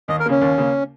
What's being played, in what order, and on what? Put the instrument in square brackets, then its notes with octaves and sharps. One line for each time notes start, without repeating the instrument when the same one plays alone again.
[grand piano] D#2 [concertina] D#5
[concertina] A#4
[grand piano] C#3 A#3 [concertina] C#4
[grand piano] D#2
C#3 A#3